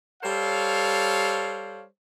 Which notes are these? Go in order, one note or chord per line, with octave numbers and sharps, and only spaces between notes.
G3 A4 C5 C#5 F5